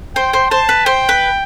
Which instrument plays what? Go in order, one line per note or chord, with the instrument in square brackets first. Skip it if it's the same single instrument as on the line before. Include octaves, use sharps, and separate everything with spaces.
[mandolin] C5 [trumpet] G5
[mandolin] C5
[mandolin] C5 [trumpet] A5
[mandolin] B4
[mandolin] C5 [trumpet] G5
[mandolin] B4